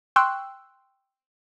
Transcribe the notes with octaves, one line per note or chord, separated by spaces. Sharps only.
G5 C6 C#6 E6 F#6